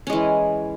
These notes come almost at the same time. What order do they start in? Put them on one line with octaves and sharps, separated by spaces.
C#4 G#3 E3